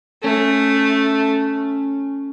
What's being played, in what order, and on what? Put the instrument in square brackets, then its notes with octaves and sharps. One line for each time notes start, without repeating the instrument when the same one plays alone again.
[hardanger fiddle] A3 [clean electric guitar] C#4